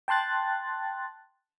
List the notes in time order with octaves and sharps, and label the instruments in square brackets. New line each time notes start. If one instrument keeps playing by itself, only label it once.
[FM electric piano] G5 A5 C6 F#6 A6